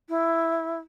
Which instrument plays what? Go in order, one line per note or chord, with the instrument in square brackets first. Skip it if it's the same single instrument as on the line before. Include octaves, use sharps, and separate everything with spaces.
[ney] E4